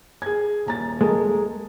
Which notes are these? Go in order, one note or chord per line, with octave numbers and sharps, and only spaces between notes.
G#4 G#6
D#1 A#5 A6
G#3 A4 A#4